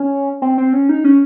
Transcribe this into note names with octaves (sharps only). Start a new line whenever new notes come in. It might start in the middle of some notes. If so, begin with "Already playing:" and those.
Already playing: C#4
C4
C4
C#4
D#4
C#4